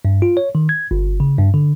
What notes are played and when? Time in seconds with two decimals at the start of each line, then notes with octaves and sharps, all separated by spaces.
0.05 G2
0.22 F4
0.37 C#5
0.55 D#3
0.69 G#6
0.91 G1
1.20 C#3
1.38 G2
1.54 D3